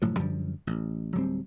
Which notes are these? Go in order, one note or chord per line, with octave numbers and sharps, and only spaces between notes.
F#1 A2 F3 F#3
F#2 D3 F3 G3
A1
D1 F#3 G3 C4